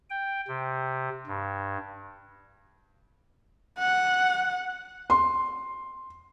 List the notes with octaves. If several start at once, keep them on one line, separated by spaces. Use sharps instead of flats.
G5
C3
G2
F#5
C6